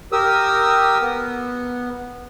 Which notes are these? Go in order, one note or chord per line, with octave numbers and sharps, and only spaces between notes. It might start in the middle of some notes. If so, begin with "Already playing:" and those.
G4 A#4 D#6 E6
B3